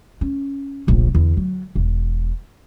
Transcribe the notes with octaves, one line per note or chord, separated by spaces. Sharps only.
C#4
D1 A#1
E2 D3
F#3
E1